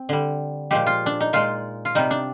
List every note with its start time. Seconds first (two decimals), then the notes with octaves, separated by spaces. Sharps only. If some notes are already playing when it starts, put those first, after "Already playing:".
Already playing: C4
0.09 D3 G3
0.71 A#2 F3 G#3 G4
0.86 F4
1.06 D4
1.20 D#4
1.33 A#2 G#3 F4
1.85 F4
1.95 C3 G3 D#4
2.11 D4